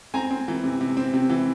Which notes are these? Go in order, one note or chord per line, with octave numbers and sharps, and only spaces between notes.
C4 G#5 A#5
C4
E3
C3
C3
C4
C3
E3